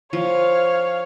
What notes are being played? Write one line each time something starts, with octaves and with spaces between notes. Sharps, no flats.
F3 C#5 F5